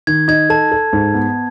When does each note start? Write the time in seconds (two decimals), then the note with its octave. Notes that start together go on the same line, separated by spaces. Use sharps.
0.07 D#3 G#6
0.28 D#4 G#6
0.50 A4 A5
0.72 A4
0.93 G#2
1.14 B3